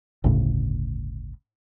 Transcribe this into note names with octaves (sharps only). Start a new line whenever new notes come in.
G1 D2 A2 C#3